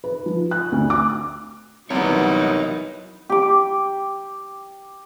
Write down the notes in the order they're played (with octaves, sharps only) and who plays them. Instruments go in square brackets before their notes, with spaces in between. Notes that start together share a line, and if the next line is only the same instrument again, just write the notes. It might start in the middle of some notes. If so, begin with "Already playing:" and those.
[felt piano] B4
F3
F#6
D2
D6
[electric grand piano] C2 [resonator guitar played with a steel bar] C3 B3 [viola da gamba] E3 F#3 D#4 [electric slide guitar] A#4 C#5
[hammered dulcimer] G4 D6